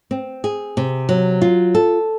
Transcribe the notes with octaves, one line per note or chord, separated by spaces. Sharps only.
C4
G#4
C3
F#3
F4
A4